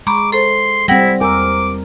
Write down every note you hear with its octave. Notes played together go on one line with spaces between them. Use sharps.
G#3 A#5 B5 C#6 D6
A4 C5 C6
G3 C4 E4 F#5 G5 A#6
E2 A#4 D6 E6